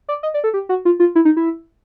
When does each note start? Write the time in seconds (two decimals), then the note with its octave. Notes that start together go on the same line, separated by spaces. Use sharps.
0.09 D5
0.23 D#5
0.34 D5
0.44 A4
0.54 G4
0.69 F#4
0.85 F4
1.00 F4
1.15 E4
1.25 D#4
1.37 E4